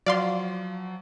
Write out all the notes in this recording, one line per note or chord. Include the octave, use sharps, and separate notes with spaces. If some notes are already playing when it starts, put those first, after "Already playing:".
F3 F#3 D5 F5 C6